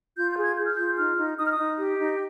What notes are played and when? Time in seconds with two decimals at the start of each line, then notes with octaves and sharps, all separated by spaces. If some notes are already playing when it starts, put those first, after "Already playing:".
0.16 F4 G6
0.30 G6
0.37 G#4
0.43 G#6
0.56 G#4 G6
0.66 F6
0.75 F4 G6
0.97 D#4 F6
1.17 D#4
1.38 D#4 D#6
1.45 F6
1.52 D#6
1.59 D#4
1.78 G4
1.98 D#4